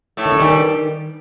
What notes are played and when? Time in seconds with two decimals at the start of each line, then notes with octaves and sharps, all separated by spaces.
0.17 A2 A3
0.25 D#3
0.32 D3
0.39 G2 D#3 G3